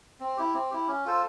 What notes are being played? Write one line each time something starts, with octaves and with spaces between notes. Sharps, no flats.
C4
E4 G4
C4
E4 G4
C#4
F4 A4 C5